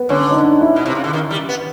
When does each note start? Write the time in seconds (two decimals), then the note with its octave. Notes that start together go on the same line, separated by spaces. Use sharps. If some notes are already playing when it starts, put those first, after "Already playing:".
Already playing: B3
0.09 D3 C#4
0.31 D#4
0.35 D4
0.61 E4
0.76 B2
0.86 C3
0.95 C#3
1.04 D3
1.13 D#3
1.31 G3
1.49 B3